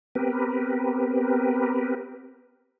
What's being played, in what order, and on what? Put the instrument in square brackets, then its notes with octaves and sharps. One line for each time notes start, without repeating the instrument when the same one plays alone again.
[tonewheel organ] B3 C4 G4 A#4 B4